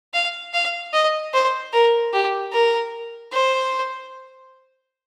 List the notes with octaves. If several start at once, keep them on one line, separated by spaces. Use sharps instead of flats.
F5
F5
D#5
C5
A#4
G4
A#4
C5